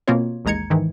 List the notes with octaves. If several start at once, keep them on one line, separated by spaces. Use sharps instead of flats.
B2 A#3 C4 F4 C#5
A1 D#2 G#3 A#5 G#6 C#7
G#2 D#3 E3